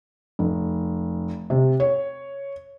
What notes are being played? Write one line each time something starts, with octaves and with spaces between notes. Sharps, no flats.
F1
C3
C#5